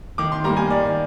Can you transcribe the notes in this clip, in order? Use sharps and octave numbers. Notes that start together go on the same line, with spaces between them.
D#3 D6
C6
G3 A#3 A#5
G#5
D#3 D5